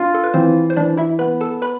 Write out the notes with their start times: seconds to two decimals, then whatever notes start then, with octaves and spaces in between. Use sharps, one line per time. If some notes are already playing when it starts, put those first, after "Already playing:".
Already playing: D4 F4 D5
0.14 A4
0.24 B4
0.34 E3 C4 C5
0.70 C5
0.77 E3 D4 D5
0.97 E4 E5
1.19 B3 B4 B5
1.41 A4 A5
1.62 B4 B5